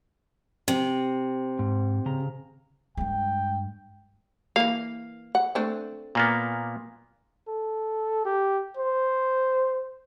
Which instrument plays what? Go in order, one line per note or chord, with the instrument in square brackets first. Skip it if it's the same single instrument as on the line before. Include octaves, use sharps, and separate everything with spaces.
[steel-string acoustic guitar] C3
[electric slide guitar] G#2
C#3 A#5
[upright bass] G2 G#3 [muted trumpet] G5
[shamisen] E3 A#3 [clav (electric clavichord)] F5
[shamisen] F#5
A3 C4 D4
[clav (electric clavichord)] A#2 A#3 B3
[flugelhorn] A4
G4
C5